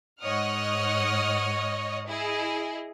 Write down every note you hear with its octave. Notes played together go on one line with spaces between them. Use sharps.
G#2 C#5 D#5 F#5 D#6 F6
E4 G#4 D#5